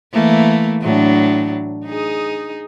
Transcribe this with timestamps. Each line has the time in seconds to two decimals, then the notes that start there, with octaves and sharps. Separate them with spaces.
0.13 E3 A3 A#3
0.81 A2 F#3 D4
1.85 D#4 G#4